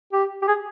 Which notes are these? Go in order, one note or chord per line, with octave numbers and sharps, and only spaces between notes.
G4
G4
G#4